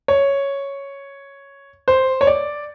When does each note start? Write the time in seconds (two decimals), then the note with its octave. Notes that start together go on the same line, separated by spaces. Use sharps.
0.08 C#5
1.88 C5
2.21 C#5
2.27 D5